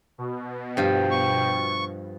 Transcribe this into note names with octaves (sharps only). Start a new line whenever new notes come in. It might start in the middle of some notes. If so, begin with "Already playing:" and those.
B2
G2 F3 G5
C#6